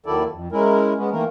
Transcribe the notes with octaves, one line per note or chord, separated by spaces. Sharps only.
D#2 D#3 F#3 E4 A4 D5
F2
G#3 C#4 E4 A#4
G#3 B3 C#4
D#3 E3 A3 A#3 A#4